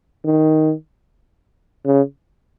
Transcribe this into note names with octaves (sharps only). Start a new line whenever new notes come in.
D#3
C#3